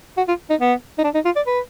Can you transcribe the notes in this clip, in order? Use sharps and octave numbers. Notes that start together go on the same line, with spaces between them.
F#4
F4
D#4
B3
D#4
D4
D#4
F4
D5
B4